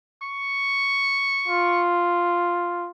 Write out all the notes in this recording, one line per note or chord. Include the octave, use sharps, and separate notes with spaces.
C#6
F4